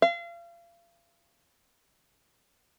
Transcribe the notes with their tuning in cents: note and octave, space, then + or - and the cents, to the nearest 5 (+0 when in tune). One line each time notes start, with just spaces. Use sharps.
F5 -35